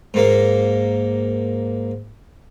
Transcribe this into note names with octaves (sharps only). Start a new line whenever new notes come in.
G#2 A#3